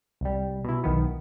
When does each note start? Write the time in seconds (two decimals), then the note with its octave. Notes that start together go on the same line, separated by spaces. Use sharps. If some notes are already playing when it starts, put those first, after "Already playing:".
0.21 C2 G3
0.64 B2 E4
0.84 B1 D#3 B3